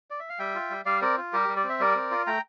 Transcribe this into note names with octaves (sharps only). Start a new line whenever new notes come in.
D5
E5
F5
G3 E5 G5
F4
G3
G3 D5 F5
C4 A#4 D5
F4
G3 G4 A#4
G3
D5
C4
E5
G3 A#4 D5
C4
F4
A3 G5 A#5